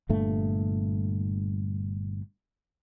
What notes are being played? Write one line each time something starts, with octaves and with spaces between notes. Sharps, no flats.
G1 G2 A#2 A3